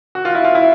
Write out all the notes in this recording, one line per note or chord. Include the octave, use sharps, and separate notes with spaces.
F#4
F4
E4
F4
E4